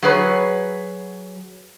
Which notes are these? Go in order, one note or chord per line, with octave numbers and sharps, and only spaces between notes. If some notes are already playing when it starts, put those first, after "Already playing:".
F#3 G#4 B4 C#5